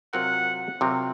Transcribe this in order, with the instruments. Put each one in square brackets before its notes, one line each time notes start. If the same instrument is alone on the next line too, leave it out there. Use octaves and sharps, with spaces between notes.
[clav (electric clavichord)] C3 F#3 C4 F4 A#4 [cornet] F#5
[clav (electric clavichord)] C3 F#3 C4 F4 A#4